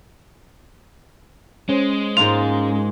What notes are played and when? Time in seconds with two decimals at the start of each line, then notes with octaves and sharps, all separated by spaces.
1.69 G#3 C#4 C5
2.17 G#2 A#3 F4 F7